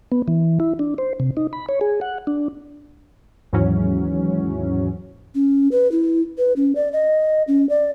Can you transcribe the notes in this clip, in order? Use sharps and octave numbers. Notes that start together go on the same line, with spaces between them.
B3
E3
E4
D4
C5
C3
D#4
B5
C#5
G#4
F#5
D4
D#2 G#2 E3 F#3 C#4
C#4
B4
E4
B4
C#4
D5
D#5
C#4
D5